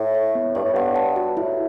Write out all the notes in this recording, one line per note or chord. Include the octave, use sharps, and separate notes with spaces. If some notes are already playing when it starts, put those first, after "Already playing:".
Already playing: A2
C#5
B3
G2 C#5
A2
G2 F#5
A5
F#4
A2 E4